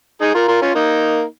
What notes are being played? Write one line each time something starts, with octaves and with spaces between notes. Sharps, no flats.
D#4 G#4
F4 A#4
F4 A#4
C#4 F4
A#3 D#4